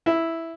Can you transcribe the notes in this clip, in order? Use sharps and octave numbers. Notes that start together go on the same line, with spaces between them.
E4